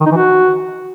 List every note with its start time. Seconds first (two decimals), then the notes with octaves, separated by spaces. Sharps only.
0.01 D#3
0.06 D#4
0.11 E3
0.17 F#4